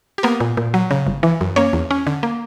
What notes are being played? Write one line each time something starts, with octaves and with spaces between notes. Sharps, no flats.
G4
A#3 B3 A#4
A#2
A#2
F#3
C#3
G1
E3
F#2
A#3 C#4 C#5
E2
C#4
D3
A#3